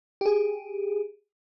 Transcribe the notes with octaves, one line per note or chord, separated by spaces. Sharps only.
G4 G#4